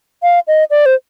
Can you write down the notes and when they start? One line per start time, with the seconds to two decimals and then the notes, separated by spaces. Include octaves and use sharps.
0.23 F5
0.48 D#5
0.71 D5
0.86 C5